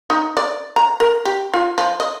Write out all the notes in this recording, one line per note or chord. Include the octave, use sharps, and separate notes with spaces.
D#4
D5
A#5
A#4
G4
F4
F3
D#5